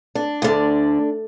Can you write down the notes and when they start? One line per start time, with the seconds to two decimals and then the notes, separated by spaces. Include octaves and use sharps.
0.15 D4
0.42 D2 D3